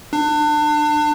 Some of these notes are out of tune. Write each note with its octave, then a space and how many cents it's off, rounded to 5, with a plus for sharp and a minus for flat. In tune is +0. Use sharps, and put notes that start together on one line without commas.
D4 +30